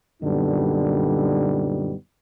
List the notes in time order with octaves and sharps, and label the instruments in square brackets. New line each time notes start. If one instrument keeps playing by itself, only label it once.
[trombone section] F#2 A#2 D3 G3 B3 D#4